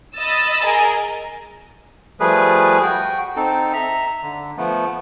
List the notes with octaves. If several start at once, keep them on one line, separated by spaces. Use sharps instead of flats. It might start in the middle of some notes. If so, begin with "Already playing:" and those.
D#5 B5 D#6 E6 A6
G#4 A#4 D#5 G#5
F3 G3 A3 G#4 B4
F#4 G5
C4 D#4 A4
E5 A#5
D3
F3 A3 B3